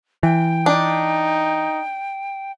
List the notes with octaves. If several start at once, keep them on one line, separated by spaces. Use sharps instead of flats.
E3 G5
D4 D#4